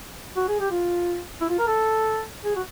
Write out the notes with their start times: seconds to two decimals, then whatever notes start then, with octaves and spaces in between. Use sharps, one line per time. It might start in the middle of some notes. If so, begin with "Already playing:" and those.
0.36 F#4
0.48 G#4
0.60 G4
0.71 F4
1.41 E4
1.49 F4
1.58 A#4
1.67 A4
2.44 G#4
2.56 F#4